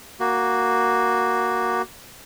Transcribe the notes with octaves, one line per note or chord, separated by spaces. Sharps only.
A#3 F#4